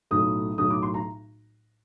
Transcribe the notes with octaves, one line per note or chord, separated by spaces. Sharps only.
B1 A2 F#3 A3 D#6
B1 A2 F#3 A3 D#6
D6
C6
A#5